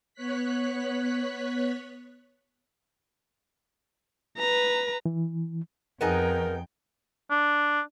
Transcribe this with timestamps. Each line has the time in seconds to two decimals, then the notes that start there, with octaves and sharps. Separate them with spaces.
0.14 B3 C#5 F#6 B6
4.38 B4 A#5
5.06 E3
6.01 F2 B3 D#4 G#4 A#4 G5
7.30 D4